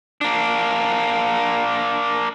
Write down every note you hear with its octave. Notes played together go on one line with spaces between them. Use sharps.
A#3 D4